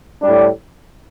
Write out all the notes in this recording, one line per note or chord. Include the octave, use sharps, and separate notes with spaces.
A2 G3 D4